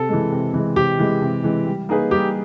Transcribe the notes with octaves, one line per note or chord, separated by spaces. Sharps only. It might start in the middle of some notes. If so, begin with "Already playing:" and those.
Already playing: C3 A4
E3 G#3
C3
E3 G#3
C3 G4
E3 G#3
C3
E3 G#3
G3
A#3 D#4 G#4 B4
G3 G4